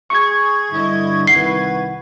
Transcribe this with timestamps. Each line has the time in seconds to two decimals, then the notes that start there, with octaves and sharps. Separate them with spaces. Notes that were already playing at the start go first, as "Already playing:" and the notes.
0.10 G#4 C#6 G#6
0.72 G2 D3 E4 D#5
1.27 C2 D#3 E4 B4 F#5 C7